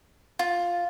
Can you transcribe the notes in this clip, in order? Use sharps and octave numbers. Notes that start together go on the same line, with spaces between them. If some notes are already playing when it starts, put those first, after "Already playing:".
F4